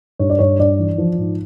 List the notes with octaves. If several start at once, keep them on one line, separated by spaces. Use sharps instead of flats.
G2 C#5
D5
G2 C#5
G2 D5
E3
F3
G#2